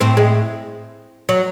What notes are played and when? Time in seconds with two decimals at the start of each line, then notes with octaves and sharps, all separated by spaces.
0.01 A2 C4
0.17 G#3
1.29 F#3